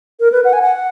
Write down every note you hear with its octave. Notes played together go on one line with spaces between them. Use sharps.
A#4
B4
F#5
G#5
F#5